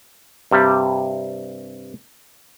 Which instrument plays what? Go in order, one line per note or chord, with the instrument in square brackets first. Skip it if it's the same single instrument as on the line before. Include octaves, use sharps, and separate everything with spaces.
[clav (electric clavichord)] G2 C3 G3